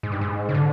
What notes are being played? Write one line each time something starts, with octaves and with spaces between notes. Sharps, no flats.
G#2
G2
G#2
C#3
D3